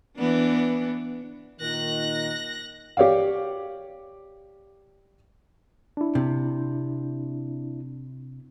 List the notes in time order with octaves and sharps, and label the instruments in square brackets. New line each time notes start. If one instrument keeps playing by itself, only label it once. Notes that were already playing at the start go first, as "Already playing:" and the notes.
[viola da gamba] E3 B3 D4
[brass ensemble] A#2 D#3 [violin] F#6 A#6
[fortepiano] G4 C#5 D5 F5
[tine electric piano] D4 E4
[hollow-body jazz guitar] C3